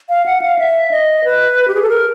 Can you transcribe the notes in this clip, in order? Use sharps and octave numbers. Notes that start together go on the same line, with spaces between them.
F5
F#5
F5
E5
D#5
B4
G4
G#4
A4
A#4